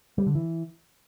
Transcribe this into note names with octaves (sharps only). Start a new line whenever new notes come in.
G3
D3
E3